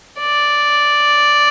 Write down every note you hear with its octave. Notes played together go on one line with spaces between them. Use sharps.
D5